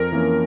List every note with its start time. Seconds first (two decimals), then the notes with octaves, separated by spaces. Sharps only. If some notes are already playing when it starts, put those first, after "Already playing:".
Already playing: F2 A#4
0.12 E3 A#3 C#4